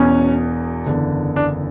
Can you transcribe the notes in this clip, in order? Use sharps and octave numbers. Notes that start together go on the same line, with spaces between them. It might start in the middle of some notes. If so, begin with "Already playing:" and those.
Already playing: E1 E2 B2 C#4
F#1 E2 D3
D4